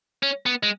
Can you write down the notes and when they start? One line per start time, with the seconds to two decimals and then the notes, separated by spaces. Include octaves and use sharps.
0.23 C#4
0.46 B3
0.63 G#3